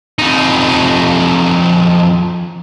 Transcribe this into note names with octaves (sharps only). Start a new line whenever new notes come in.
F2 D#4